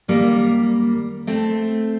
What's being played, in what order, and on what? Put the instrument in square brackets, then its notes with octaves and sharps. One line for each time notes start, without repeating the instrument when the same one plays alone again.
[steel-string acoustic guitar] F#2 D#3 G3 A#3
A3 C4